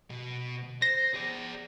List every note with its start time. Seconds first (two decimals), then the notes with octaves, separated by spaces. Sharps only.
0.10 B2
0.82 C5 A#6
1.14 G#4 D5